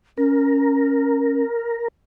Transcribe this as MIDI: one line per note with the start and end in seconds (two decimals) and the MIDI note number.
0.18 1.42 61
0.18 1.88 70